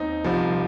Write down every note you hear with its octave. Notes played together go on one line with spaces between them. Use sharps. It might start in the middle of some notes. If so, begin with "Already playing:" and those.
Already playing: D#2 C4 C#4 D#4
C2 C3 F3